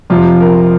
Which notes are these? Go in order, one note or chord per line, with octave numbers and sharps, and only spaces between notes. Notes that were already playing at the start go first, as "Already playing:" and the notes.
F2 C3 F3 F4
A#4